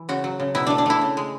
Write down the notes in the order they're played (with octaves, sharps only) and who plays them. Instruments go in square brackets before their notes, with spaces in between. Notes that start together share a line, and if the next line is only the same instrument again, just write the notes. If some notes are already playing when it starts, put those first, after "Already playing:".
Already playing: [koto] E3
C#3 F#4
F#3
C#3
B2 E4
A3 D4
D4
A3 E4
C#3
G#3